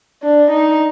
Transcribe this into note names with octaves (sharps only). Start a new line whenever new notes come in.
D4
D#4